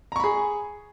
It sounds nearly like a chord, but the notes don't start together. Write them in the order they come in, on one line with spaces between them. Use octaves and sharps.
A#5 C#6 B5 G#4